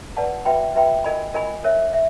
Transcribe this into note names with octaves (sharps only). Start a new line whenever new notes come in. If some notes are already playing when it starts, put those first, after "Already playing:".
B4 D5 F#5 A5
F#4 B4 E5 G5 B5
F#4 B4 E5 G5 B5
F4 A#4 D#5 G#5 B5
F4 A#4 D#5 G#5 B5
A#4 C#5 E5
E5